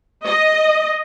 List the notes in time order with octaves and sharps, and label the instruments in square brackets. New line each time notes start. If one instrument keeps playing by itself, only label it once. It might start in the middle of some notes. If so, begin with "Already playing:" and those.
[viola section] D#5